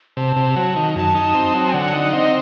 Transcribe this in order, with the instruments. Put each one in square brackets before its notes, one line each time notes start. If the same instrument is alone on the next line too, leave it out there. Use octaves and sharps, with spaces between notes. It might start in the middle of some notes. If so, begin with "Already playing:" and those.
[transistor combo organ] C3 [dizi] A5
[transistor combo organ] C3
F#3
D#3
[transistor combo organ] F#2 [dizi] A5
[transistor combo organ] D#4
C4
F#3
[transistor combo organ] D3 [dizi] F#5
[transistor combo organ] D#4
[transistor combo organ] C4 [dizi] D#5